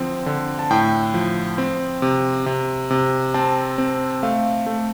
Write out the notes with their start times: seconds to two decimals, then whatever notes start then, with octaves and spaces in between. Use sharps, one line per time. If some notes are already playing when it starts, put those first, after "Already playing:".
Already playing: D3 F3 C4
0.26 D3
0.59 A5
0.71 A2 G5
1.14 F3
1.58 C4
2.02 C3
2.46 C3
2.90 C3
3.34 C4 A5
3.78 C4
4.23 A3 F5
4.66 A3